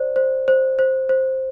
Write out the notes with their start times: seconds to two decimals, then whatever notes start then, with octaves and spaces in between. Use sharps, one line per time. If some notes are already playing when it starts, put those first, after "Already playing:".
Already playing: C5 D5
0.16 C5
0.48 C5
0.79 C5
1.09 C5